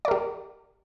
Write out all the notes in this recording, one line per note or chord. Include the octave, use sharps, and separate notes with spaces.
G4 A#4 D5